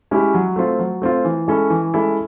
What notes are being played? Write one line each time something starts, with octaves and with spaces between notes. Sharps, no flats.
G#3 C#4 E4 G4
F#3
A3 C4 F4
F#3
A3 C4 F4
E3
G#3 C#4 E4 A4
E3
G#3 C#4 E4 A4